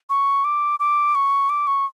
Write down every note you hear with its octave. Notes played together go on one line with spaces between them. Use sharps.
C#6
D6
D6
C#6
D6
C#6